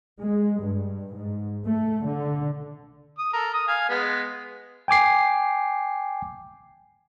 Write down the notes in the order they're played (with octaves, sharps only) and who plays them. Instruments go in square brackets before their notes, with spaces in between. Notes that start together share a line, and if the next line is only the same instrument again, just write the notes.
[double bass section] G#3
G2
G#2
A3
D3
[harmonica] D#6
A4 A#4
D#6
F5 G#5
G#3 B3
[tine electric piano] G5 G#5 D6 C7